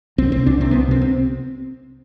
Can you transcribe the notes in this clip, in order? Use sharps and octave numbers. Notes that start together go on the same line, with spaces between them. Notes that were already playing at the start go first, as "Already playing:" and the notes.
C2 C4
C3 C4
C2 D4
C3 C4
C2 B3
C3 C4
C4